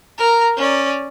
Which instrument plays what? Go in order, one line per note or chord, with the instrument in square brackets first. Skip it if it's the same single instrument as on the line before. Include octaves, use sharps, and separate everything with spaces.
[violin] A#4 A#5
C#4 D5